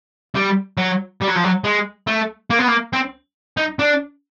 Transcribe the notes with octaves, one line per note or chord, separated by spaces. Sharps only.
G3
F#3
G3
F#3
F3
F#3
G#3
A3
A#3
B3
A#3
C4
D#4
D4